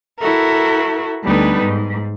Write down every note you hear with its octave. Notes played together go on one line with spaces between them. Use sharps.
E4 F#4 A4 A#4 E5
D2 G3 B3 D#4 A4 B4
G#2